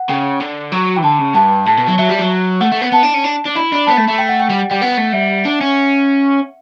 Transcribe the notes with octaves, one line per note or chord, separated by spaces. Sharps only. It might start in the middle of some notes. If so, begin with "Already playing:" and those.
Already playing: F#5
C#3 G5
D3
F#3
E3 G5
D3 A5
C#3
G2 A5
A2 A5
B2
F#3
F#3 E5
G3
F#3
A3 F#5
A3
B3
B3 A5
D4
C#4
D4
D4
E4 B5
D4
B3 A5
A3
A3
G5
F#5
G5
G3
G3 G5
B3 F#5
A3
G3 E5
D4
C#4